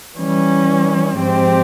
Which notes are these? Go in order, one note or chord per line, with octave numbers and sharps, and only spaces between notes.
E3 G3 C#4
G#2 F3 C4 G4 C5